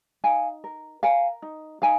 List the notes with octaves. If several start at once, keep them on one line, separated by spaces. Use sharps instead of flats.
D#4 F5 G#5
A#4
A#4 F5 G#5
D#4
D#4 F5 G#5